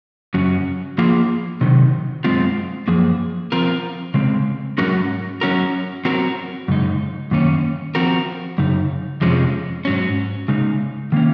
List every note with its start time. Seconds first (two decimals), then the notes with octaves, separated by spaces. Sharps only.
0.34 F#2 C#3 F#3 C#4
0.98 F3 A#3 F4 G#4
1.61 C3 D#3 F#3
2.24 F#2 D#3 G#3 C4 F4
2.88 F#2 F3 A#3 G#4
3.52 F3 C4 F4 A#4
4.14 C#3 G#3 C4
4.78 G#2 F#3 C#4 F#4 A#4
5.41 F#3 C#4 F#4 A#4
6.05 F#3 C4 F#4 A#4
6.68 F#2 C#3 G#3 D#4
7.31 F#2 D#3 A#3 C#4
7.95 F3 C4 F#4 A#4
8.58 F#2 C#3 D#4
9.21 F2 C3 F3 G#3 C#4
9.85 G#2 F#3 C#4
10.48 C#3 G#3 D#4
11.12 D#3 A#3 C#4